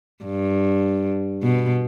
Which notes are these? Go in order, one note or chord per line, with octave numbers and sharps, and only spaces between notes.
G2
B2